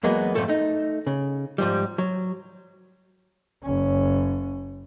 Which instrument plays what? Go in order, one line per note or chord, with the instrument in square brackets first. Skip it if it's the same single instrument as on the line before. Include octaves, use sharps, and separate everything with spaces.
[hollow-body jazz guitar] E2 F#3 G#3 A#3 B3
F2 G#2 B2 A3 A4 C#5
A3 D#4
C#3
G#2 F3 G3
F#3
[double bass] F#1 C#4